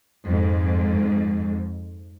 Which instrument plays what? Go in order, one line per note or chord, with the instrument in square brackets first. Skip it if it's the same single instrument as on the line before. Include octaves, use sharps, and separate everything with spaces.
[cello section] F2 G#2